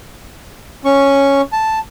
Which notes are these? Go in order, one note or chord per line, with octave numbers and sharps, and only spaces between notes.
C#4 C#6
A5